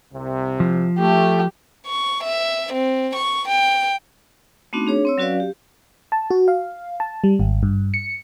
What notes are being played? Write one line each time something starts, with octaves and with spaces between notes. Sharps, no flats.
C2 C3
F3
A3 G4
C#6
E5
C4
C#6
G5
A3 B3 C4 D4 D#4 F#4
D4 G#4 C#5
C4 C#5 E6
F#3 C#4 F#4 B4 D5 F5
G4
A5
F#4
F5
A5
G3
G#1
G2
C#7